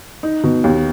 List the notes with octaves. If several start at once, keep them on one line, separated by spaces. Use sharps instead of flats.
D#4
B2
D#2